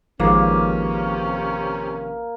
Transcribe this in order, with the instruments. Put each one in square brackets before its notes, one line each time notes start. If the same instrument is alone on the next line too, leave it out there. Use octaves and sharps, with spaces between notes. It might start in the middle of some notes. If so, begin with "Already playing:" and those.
[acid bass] A1 [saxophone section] C3 C#4 [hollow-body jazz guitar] D#3 F3 G#3 [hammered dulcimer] A#3